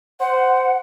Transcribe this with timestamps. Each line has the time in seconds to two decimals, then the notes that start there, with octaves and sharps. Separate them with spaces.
0.20 C5 F#5